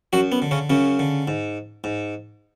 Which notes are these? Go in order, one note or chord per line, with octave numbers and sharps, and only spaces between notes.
F#2 F#3 F#4
B3
D3
C#3 C#4
F#2 C#3 C#4
D3
G#2
G#2